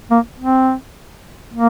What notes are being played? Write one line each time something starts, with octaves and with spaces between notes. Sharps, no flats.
A#3
C4
A#3